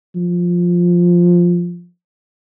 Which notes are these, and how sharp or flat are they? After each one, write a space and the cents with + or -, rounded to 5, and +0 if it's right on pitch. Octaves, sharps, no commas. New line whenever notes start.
F3 +5